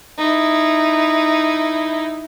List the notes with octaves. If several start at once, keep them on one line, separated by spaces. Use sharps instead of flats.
D#4 E4